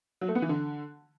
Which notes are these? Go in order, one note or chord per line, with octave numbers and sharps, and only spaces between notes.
F#3
A3
B3
E3
D3